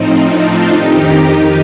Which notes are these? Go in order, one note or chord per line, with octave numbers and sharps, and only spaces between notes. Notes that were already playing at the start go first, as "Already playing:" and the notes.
Already playing: A2 F3 C4 D#4
D4 F4
F2 D#3 D#4 G4
D#4 G4